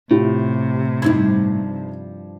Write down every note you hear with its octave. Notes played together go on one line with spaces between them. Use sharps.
A2 C3 E4 F4 G4
G2 F3 D#4 E4 G#6